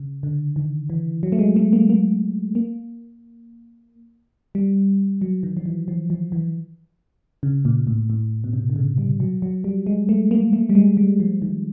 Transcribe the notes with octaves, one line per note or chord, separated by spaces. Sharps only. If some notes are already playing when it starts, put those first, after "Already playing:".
Already playing: C#3
D3
D#3
E3
F#3
A3
G#3
A3
A#3
A#3
A#3
G3
F#3
D#3
F3
E3
F3
F3
E3
C#3
A#2
A2
A2
B2
C3
D3
C#3
G3
F#3
F#3
G3
G#3
A3
A#3
A3
G3
G#3
G3
F3
D#3